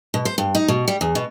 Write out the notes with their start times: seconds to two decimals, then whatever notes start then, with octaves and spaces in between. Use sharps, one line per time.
0.14 B2
0.25 C5
0.38 G2
0.55 D#4
0.68 B2
0.88 G3
1.01 E2
1.15 B2